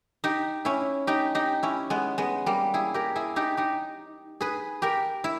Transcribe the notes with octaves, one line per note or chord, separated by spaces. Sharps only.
D#4 G4
C#4 E4
D#4 G4
D#4 G4
C#4 E4
G#3 B3
G#3 B3
G3 A#3
E4 G#4
G4 A#4
E4 G#4
D#4 G4
D#4 G4
G#4 B4
G4 A#4
E4